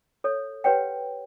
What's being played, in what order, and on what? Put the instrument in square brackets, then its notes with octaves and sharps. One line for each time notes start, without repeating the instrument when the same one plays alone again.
[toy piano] A4 C#5
G4 B4 C#5 F#5 G5